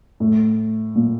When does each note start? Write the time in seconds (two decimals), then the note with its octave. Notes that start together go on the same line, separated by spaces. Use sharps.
0.20 A2
0.95 A#2